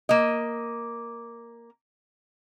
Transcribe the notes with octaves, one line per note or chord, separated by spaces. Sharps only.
A#3 D#5